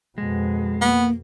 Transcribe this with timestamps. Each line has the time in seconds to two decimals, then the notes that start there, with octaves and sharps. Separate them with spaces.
0.18 F2 B2 G#3
0.81 A#3 B3